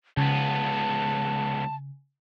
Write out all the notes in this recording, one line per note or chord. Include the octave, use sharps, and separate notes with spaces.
C#2 C#3 B3 A5